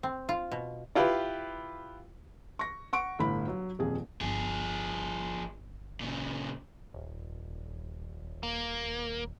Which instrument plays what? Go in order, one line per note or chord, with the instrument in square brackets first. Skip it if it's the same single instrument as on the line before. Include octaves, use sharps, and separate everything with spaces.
[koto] C4
F4
B2
[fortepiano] E4 F4 G4 B4
[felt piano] C#6 A#6
F#5 C#6 D7
G1 A2 B5
F#3
D#1 F2 G#4
[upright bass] G1 [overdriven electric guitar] F3 G#4
[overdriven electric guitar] A#2 C#3
[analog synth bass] D#1
[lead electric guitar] A#3